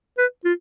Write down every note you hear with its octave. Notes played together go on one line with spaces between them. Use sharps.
B4
F4